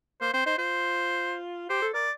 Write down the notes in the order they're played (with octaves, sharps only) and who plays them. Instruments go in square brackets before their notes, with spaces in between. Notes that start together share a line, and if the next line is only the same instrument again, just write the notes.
[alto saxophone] A#3 [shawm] C5
[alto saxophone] C4 [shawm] C5
[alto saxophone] D#4 [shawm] C5
[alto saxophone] F4 [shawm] C5
[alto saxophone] G4 [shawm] C5
[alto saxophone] A4
[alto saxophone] A#4 [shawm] D5